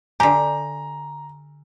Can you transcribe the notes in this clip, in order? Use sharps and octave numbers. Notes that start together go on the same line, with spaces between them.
D3 G4 G#5 A#5